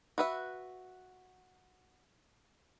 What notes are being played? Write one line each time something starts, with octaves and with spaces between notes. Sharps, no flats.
F#4 B4 E5